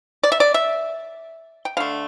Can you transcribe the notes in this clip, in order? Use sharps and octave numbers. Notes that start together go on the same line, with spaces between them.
D5
E5
D5
E5
G5
D3 A3 F5